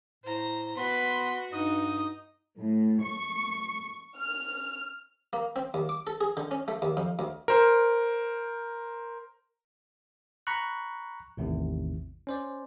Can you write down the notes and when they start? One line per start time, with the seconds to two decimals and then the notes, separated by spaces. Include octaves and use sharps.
0.24 A2 C5 A#5
0.77 B3 F#4 B4 C6
1.53 G2 D#4 D#6
2.58 A2
3.04 C#6
4.16 F6
5.33 A#3
5.56 C4
5.74 D#2
5.89 D6
6.07 A4
6.21 G#4
6.37 D3
6.51 C#4
6.68 A3
6.82 D#2
6.97 F2
7.19 D2
7.48 A#4 C5
10.47 A#5 B5 C#6 F#6
11.37 A1 E2 A2 C3 D#3
12.27 C#4 C5 D5